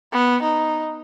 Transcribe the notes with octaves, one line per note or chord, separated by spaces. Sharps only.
B3
D#4